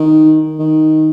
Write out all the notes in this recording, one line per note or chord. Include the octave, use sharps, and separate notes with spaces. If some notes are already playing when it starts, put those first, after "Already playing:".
Already playing: D#3
D#3